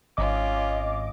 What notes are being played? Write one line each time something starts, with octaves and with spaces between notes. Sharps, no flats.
G#1 C#4 F4 D#5 D6